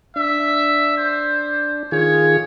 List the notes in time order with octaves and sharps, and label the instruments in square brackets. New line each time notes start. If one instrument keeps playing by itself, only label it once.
[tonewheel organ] D4 [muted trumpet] E5
[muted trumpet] C5
[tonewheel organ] D#3 F4 G#4 [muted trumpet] C#5